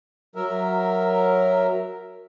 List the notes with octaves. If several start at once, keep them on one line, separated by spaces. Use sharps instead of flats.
F#3 A#4 E5